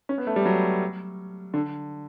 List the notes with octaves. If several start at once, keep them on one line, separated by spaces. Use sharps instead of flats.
C#4
B3
A3
G3
F#3
D3